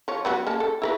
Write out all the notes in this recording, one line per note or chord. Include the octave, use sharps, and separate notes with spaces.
F3 C#5
F#3 B3 F#4
A#3 C#4 A5
A4
E4 A#4 B4